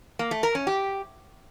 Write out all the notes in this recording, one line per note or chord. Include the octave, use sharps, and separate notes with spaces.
A#3
A3
A#4
C#4
G4